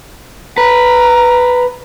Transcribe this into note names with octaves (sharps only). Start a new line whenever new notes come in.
B4 A#5